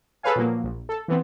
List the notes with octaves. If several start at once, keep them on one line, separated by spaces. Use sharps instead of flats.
G#4 A4 B4 C#5 F5 G#5
A#2 F3 F#3 A#3
A#1
A4
E3 B3 C4